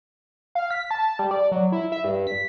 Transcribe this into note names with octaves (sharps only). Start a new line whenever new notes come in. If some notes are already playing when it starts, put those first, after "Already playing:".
F5
B6
A5
G3
D5
F#3
E4
E5
G2
B6